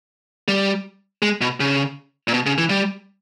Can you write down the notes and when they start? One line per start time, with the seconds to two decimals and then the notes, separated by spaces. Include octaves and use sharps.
0.48 G3
1.22 G#3
1.41 B2
1.60 C#3
2.28 A#2
2.34 B2
2.46 C#3
2.58 E3
2.70 G3